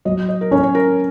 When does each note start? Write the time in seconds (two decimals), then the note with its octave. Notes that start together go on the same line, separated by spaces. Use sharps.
0.05 F#3 D#5
0.29 D#5
0.41 A#4
0.51 C#4 C#5
0.63 C#5
0.75 A#4